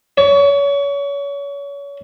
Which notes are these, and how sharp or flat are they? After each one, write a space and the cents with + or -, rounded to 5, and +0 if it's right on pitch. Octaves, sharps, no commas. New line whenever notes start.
C#5 +30